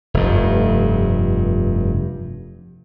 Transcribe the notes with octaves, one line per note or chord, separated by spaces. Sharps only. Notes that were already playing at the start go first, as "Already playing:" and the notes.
F1 G2